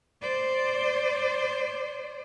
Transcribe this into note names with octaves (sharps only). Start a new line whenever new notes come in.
C5 D5